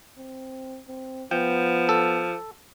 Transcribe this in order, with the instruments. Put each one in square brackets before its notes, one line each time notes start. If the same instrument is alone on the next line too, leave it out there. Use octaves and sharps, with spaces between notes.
[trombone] C4
C4
[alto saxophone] F3 [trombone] B3 [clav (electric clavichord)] G5
[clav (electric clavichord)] A4